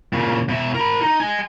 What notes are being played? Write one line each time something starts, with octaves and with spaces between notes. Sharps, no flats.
A#2 C#3
B2 E5
A#4 B5
D#4
D#5 G#5